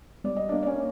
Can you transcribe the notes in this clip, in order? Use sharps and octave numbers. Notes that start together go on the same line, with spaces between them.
G3 D5
D#5
D4 D5
A#3
D5
C#4 C#5